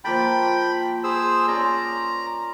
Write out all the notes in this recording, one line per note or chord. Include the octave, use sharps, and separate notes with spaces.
F3 A#3 G5 A5 B5
G#4 C5 E6
C#4 D5 A#5 C6